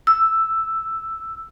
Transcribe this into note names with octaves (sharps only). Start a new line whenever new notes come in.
E6